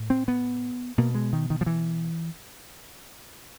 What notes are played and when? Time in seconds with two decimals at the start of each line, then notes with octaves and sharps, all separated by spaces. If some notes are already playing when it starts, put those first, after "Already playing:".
Already playing: A2
0.10 C4
0.28 B3
0.98 B2 A#3
1.15 G#3
1.33 D#3
1.50 D#3
1.61 F3
1.66 E3